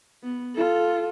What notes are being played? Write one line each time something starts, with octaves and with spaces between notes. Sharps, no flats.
B3
F4 A4